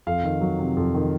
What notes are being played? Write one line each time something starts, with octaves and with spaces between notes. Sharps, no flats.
F2 F5
D#3
F#3
C3
F2
D#3